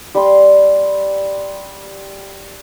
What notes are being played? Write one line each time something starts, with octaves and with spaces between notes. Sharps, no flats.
G3 C6